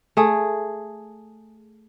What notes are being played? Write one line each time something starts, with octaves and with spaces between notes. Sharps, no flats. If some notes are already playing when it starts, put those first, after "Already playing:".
A3 G#4